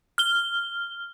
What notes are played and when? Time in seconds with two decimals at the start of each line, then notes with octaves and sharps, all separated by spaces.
0.18 F6 G7